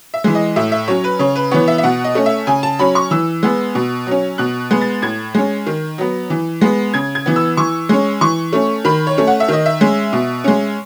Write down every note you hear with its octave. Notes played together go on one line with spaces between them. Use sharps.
E5
E3 G#3
D#5
A2 E5
E5
F#3 C#4 C#5
B4
C#3 C#5
B4
E3 B3 C#5
E5
E5
B2 F#5
D#5
A3 C#4
E5
C#3 G#5
A5
F#3 C#4 B5
C#6
E3 E6
G#3 B3
B2
F#3 C#4
B2 F#6
G#3 B3
A6
A2 G#6
G#3 C#4
D#3
F#3 B3
E3
G#3 B3
C#3 G#6
G#6
E3 B3
E6
E3 C#6
G#3 C#4
E3 C#6
A3 C#4
D#3 B5
C#5
A3 C#4
F#5
E5
D#3 D#5
E5
G#3 C#4
B2
G#3 C#4